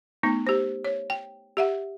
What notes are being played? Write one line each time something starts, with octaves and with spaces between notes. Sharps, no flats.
A3 B3 D#4
G4 C5
C#5
G5
G4 E5 F#5